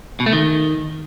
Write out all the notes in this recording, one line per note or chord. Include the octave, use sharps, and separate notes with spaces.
B2
A3
D#3